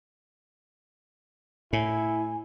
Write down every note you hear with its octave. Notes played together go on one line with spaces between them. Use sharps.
A2 E4 G#5